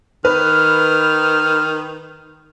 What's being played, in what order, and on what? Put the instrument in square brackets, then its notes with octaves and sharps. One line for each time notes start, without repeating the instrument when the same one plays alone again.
[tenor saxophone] D#3 [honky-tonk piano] B4 [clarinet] F6